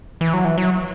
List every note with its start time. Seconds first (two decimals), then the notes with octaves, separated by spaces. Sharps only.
0.21 E3
0.33 F#3
0.44 E3
0.58 F#3